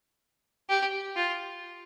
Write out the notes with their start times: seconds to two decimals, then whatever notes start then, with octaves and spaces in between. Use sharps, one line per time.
0.69 G4
1.16 F4